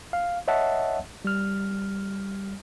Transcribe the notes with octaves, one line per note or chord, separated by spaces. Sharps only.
F5
C#5 D#5 E5 F#5 A5
G3 F6